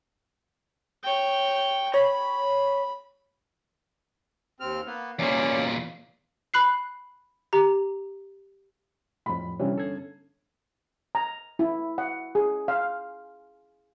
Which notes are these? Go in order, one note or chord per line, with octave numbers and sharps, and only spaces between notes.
C#5 G5
C#5 B5
D#2 C4 F6
A#3 B3
E2 A#2 A#3 C#4 D5
B5 F#6 C7
G4 A#5
F2 A2 B5
G1 C3 E3 G3 C#4
A4 G#6
A#5
E4
F#5
G#4
F5